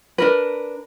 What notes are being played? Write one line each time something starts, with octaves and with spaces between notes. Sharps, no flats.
D4 A#4 B4